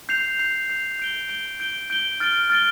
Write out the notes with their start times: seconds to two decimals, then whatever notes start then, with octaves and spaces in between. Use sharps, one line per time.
0.09 G6 C7 F7
0.39 G6 C7 F7
0.69 G6 C7 F7
0.99 G6 D7 G7
1.29 G6 D7 G7
1.60 G6 D7 G7
1.90 G6 D7 G7
2.20 F6 A6 D7 G7
2.50 F6 A6 D7 G7